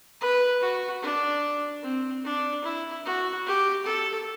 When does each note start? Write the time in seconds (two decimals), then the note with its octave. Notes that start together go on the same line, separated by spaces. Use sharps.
0.21 B4
0.61 F#4
1.02 D4
1.83 C4
2.24 D4
2.64 E4
3.05 F#4
3.46 G4
3.85 A4